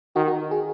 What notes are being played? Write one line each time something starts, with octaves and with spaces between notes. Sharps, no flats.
D#3 F#4
F#4
G#4